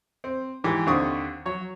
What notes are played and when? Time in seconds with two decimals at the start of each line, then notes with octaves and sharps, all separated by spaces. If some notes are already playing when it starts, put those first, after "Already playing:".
0.24 C4
0.64 G#2 E3 G4
0.86 D#2 D3 C4 C#6 D#6
1.45 F#3 C#5